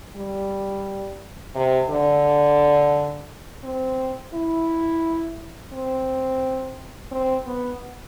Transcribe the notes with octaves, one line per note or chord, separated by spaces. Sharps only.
G3
C3
D3
C4
E4
C4
C4
B3